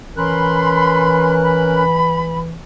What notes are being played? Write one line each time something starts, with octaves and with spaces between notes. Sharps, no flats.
E3 C#4 A#4 B5 C6 F#6
B5